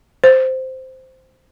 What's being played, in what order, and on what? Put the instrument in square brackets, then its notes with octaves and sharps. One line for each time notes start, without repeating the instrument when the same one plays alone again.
[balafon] C5